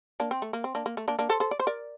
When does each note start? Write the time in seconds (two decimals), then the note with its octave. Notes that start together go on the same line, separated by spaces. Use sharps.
0.20 A#3 D4
0.31 C4
0.42 A3
0.53 A#3
0.64 C4
0.75 A#3 D4
0.86 A#3
0.97 A3
1.08 A#3 D4
1.19 A#3 D4
1.29 A4 C5
1.40 A4 C5
1.51 D5
1.59 C5
1.67 A#4 D5